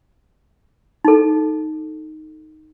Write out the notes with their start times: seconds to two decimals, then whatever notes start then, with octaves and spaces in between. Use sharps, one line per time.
1.05 D#4 A4